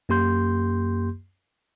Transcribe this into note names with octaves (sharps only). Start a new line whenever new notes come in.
F#2 A#3 G4 C6 G6